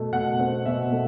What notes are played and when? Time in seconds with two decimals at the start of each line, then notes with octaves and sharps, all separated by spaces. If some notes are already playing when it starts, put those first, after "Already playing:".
Already playing: B2 A3
0.12 B2 F#5
0.39 C4
0.66 B2 E5
0.92 A3